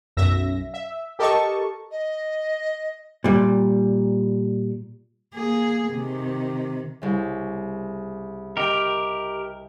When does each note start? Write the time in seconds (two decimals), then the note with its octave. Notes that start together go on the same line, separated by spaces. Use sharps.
0.17 B1 F#2 E5 A#6
0.74 E5
1.19 G4 A4 A#4 D#5 A5 C#6
1.91 D#5
3.24 A#2 G3
5.35 A#3 G#4
5.89 C3 D#3
7.02 C2 C#3
8.57 G4 A#4 D#5 G5